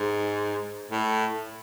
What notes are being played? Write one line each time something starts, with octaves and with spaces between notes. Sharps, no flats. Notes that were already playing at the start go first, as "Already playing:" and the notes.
Already playing: G#2
A2